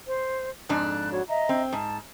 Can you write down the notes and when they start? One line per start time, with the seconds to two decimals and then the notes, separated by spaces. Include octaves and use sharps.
0.07 C5
0.69 F2 G#2 D4 F#6
1.11 F#4 C#5
1.28 D#5 E5 A#5
1.49 C4
1.73 G#2 A5